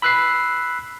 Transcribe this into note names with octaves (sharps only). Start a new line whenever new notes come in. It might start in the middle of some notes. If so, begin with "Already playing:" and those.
B5 E6 F#6 B6 C7